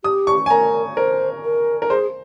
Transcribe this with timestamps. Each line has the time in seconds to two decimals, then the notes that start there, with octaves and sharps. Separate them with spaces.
0.03 G4 D#6
0.27 C#6
0.46 G#5
0.50 A#4 A#5
0.96 A#4 C5
1.44 A#4
1.82 A#4
1.90 G#4 C5